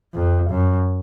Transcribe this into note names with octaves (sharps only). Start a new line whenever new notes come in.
F2
F#2